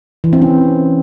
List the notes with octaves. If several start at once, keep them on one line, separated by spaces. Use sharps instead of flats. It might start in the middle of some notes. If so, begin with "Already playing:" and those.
E3
C4
C#4